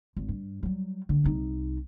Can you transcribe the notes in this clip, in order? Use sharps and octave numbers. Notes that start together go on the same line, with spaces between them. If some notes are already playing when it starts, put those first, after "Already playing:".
G#1
G2
F#3 G3
D3
C2 D#4